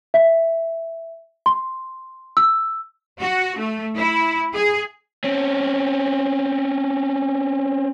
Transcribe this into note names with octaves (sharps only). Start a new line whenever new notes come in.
E5
C6
E6
F#4
A3
E4
G#4
C4 C#4